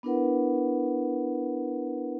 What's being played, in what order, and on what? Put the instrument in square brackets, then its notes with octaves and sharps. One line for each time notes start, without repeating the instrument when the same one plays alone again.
[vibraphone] B3 D4 E4 A#4 B4 F#5